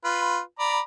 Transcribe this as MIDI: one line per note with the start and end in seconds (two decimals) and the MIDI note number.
0.04 0.40 65
0.04 0.40 71
0.59 0.80 74
0.59 0.80 82
0.59 0.80 83